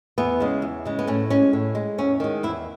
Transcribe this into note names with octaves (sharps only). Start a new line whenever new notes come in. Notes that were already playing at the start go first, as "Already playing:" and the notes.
E2 B3
C#3 G#3
E2
C#3 G#3
B3
A2 C#4
G#3 C#4
A2
G#3
E2 C#4
D#3 G#3
E2 E4